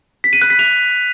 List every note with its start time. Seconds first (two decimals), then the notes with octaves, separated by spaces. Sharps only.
0.24 B6
0.33 D#7
0.42 F#6
0.50 B6
0.59 F7